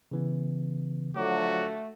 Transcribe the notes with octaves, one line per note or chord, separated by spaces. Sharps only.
C#3 E3 B3
D3 F3 F#3 A3 F#4 D6